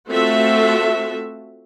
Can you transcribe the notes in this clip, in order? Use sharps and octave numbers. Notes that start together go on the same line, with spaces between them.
A3 C4 F4 F#4 A4 E5